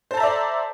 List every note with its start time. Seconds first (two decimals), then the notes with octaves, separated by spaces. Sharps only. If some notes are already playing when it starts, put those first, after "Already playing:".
0.11 C5
0.14 A4
0.17 A#5
0.20 E5
0.23 D5